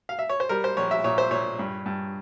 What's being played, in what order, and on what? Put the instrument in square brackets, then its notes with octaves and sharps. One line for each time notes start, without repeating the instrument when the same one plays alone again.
[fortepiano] F5
E5
C#5
C5
G3 A#4
C5
A#1 C#5
E5
A#2 C#5
C5
A#2 C#5
G2
G2